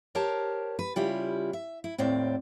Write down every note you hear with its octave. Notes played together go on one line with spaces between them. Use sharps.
G4 A#4 C5 C#5 A5
B4
C#3 G3 E4 F4 G4
E5
E4
D#2 A2 C4 D5